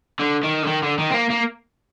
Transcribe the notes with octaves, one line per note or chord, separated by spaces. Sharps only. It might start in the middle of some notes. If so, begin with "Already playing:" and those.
D3
D#3
D3
D#3
D3
D#3
C4
A#3
A#3